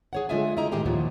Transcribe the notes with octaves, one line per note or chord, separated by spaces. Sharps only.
G#4 C#5 F#5
D3 G#3 F4 D#5 E5 G#5
E4 G4 D#5 A#5
A2 D#3 G#3 G4 G#4 A#5
D#2 A#2 F3 F#3